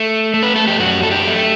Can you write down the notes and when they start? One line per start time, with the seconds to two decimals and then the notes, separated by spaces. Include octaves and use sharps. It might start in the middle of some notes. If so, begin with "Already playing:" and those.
Already playing: A3
0.34 A3
0.43 B4
0.56 A4
0.67 G4
0.80 F#2 F#4
1.03 A4
1.11 G4
1.27 A3